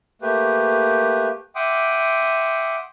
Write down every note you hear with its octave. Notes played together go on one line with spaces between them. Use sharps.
A3 A#3 G4 B4
E5 F#5 G5 C6 D6 D#6